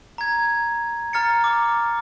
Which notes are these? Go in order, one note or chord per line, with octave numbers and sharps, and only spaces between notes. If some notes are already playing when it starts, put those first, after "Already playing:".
A#5 G#6
A#5 F6 A6 C#7
D6